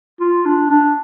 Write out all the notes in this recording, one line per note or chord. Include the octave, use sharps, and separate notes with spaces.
F4
D4
D4